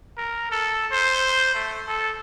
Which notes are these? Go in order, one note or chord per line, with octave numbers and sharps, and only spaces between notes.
A#4
A4
C5
A3
A4